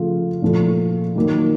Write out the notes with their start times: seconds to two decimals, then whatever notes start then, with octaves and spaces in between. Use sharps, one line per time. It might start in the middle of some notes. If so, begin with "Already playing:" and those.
Already playing: C#3 F3 A3 F4
0.42 A#2 F3 A3
1.15 D#3 F#3 A#3